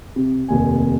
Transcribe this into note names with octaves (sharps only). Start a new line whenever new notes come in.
C3
F1 D#2 G#5